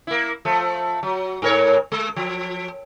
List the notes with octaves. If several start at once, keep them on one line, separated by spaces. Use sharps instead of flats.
A#3 E4
F3 A3
F#3
G#2 A#4 C#5
G#3
F3